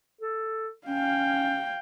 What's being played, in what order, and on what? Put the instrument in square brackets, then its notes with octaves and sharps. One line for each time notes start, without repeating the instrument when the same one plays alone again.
[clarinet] A4
[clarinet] C#4 [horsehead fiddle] F5 G5